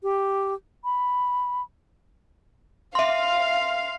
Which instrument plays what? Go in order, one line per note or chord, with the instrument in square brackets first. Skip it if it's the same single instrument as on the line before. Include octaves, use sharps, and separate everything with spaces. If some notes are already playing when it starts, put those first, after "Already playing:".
[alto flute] G4
B5
[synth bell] E5 C6 [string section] F5